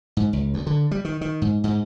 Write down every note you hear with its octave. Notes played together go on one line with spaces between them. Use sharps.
G#2
C#2
D2
D3
G3
D#3
D#3
G#2
G#2